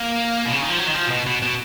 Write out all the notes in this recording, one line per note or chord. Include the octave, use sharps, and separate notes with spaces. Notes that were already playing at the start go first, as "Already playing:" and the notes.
Already playing: A#3
B2
C#3
D#3
F3
F#3
D#3
F3
A#2
B2
B2
B2